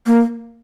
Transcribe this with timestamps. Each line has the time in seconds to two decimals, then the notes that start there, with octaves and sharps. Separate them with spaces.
0.07 A#3